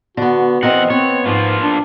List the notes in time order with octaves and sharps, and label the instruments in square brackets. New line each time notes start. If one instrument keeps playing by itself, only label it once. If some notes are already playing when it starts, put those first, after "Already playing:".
[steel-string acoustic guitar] D3 B3 [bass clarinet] F#4
[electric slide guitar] E2 F#5 [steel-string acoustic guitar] C4 A#4 D#5
[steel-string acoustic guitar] B3 [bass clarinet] C4 [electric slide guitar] C#5
[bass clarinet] G#2 [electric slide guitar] F3 A#3 F4
[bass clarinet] D4